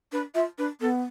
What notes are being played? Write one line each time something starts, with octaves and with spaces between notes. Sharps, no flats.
D4 B4
F4 E5
D4 B4
B3 A4